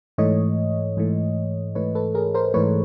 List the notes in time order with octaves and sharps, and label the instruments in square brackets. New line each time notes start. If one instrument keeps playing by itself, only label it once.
[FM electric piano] G#2 E3 A3 C#5 D#5
G#2 E3 A3
G#2 E3 A3 B4 C#5
A4 B4
G#4 A#4
A#4 C5
G#2 E3 A3 B4 C#5